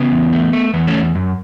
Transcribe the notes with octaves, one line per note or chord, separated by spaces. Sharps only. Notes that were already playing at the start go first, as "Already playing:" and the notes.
Already playing: C#3 B3
E2
A3
A3
E2 B3
A3 C#4
E2
F#2